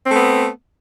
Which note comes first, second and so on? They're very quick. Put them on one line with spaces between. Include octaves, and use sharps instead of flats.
C4 A3 B3